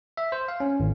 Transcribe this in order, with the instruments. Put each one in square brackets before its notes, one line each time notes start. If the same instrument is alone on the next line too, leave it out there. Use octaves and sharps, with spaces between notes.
[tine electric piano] E5
C5
F5
C#4
G#1